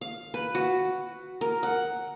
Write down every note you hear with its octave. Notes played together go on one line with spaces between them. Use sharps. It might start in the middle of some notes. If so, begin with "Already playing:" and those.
F5
B4
F#4
A#4
F#5